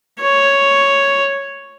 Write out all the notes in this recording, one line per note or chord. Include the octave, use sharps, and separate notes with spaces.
C#5